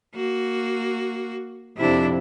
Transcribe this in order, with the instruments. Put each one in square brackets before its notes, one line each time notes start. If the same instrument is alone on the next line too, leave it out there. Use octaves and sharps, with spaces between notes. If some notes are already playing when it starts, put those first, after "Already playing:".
[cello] A#3 F#4
[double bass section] F2 C3 [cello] D4 E4